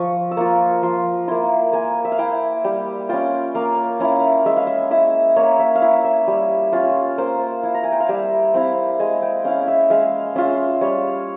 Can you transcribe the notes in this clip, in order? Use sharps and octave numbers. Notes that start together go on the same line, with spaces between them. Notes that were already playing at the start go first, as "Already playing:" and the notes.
Already playing: F3 C#6
E6
A#3 F4 C#6
F3 C6
A#3 E4 C6
A#3 G#5
E5
F5
E4 G5
G3 G5
C#4 F4 G5
A#3 F5
C#4 E4 F5
G#3 E5
F5
E5
E4 E5
A#3 C#5
E5
F5
E4 E5
E5
G3
C#4 F4
A#3 C5
E4
A#5
G#5
G5
F5
G3 E5
C4 E4 F5
G#3 G#5
G5
C#4 E4 F5
E5
G#3 F5
C#4 F4 E5
G3 C#5